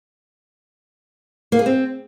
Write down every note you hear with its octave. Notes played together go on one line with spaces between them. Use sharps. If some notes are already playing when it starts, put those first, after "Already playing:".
A#3
G#4
C4